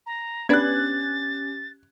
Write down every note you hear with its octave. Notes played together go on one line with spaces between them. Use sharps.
A#5
B3 C#4 D4 G4 B4 F#6 G#6 A6